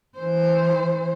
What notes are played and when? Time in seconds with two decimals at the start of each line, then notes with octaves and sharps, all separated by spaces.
0.18 E3 C5